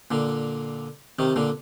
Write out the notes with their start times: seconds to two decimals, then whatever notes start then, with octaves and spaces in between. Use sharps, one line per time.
0.11 A#2 D3
1.19 C3 D#3
1.36 A#2 D3